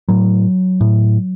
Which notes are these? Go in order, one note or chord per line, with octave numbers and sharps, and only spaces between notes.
A2 F#3
A2